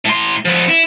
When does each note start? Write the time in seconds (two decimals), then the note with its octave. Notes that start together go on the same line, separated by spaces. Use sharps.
0.05 A2 C6
0.45 F3 B3
0.68 E4